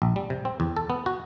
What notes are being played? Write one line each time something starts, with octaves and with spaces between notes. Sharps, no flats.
A#1
G3
C3
C4
E2
A4
B3
F#4